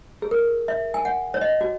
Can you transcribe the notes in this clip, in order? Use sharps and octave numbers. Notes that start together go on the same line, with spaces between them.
G#4
A#4
E5
G#5
F#5
C#5
D#5
F#4